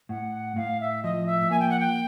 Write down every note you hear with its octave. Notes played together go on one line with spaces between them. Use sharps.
A2 F#5
A2 F5
E5
F3 D#5
E5
A#3 G#5
G5
F#5
G5